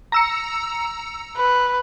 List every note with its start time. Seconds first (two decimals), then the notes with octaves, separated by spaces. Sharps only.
0.12 A#5 E6 C#7
1.37 B4